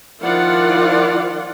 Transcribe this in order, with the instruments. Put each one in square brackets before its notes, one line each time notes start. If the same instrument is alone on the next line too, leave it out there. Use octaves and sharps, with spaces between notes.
[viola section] D#3 F3 E4 F4 D5 F#5